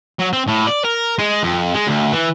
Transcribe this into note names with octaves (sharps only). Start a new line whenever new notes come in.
F#3
C4
A2
D5
A#4
G#3
F2
G#3
D2
E3